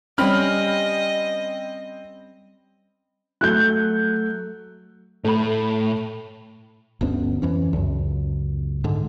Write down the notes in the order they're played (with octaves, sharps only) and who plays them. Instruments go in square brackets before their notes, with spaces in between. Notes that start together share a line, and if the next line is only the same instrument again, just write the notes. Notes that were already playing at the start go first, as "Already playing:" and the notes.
[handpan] G3 C#4 [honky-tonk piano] C4 B5 F6 [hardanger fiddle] D#5
[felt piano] F#3 A3 [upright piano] F#6 G6
[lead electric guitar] A2 [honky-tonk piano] A3 B5
[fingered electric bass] G1 D2 B3 C#4
F2 E3 C#4
C#2 F#2
G#2 D3